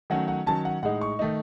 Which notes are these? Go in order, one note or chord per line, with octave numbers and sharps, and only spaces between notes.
D#3 F#3 A3 C#4 F#5
F#5
D#3 F#3 C#4 A5
F#5
A2 G#3 D#4 F#5
C#6
D#3 A3 D#4